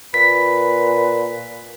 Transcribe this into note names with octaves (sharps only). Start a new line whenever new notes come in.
A#2 B4 B6